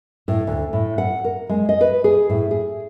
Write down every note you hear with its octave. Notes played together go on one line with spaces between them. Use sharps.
A2
D2
A2
F#5
A#4
G#3
D#5
B4
G#4
A2
G#4